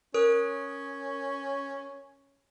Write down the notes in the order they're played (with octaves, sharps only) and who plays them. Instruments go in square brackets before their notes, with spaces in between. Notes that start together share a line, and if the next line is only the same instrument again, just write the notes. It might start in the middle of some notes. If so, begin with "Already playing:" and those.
[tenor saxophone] C#4 [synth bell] A#4 D#6